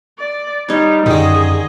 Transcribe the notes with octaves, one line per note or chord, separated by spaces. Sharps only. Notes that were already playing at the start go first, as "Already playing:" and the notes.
D5
G3 D#4 C#5
F#2 D3 D#3 G4 G#4 D#5